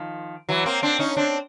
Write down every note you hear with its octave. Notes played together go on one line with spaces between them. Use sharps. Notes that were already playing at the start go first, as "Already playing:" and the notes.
Already playing: D#3 F3
E3 F#3
A#3 C4
C4 D4
C#4 D#4
C4 D4